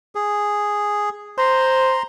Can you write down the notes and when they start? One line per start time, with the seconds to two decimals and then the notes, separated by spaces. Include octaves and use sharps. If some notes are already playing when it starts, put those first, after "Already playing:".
0.15 G#4
1.38 C5 A#5 C6